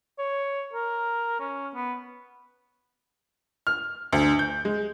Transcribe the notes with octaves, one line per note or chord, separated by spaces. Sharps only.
C#5
A#4
C#4
B3
F6
D2
G6
G#3